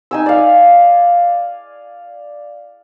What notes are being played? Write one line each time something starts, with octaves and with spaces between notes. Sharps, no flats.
D#4 G#5 E6
D5 F5